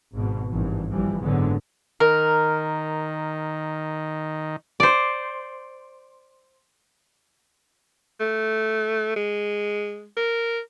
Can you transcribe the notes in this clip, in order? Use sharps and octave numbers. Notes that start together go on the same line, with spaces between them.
G#1 G#2 B2
G#1 G2 E3
A#1 E3 F3 G3
F#1 G#2 D3 F#3 G#3 B3
D#3 A#4
C5 D5
A3
G#3
A#4